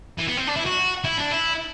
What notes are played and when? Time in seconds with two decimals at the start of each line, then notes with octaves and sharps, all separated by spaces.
0.18 E3
0.28 B3
0.37 C4
0.47 D4
0.56 E4
0.66 F#4
1.04 E4
1.17 D4
1.31 E4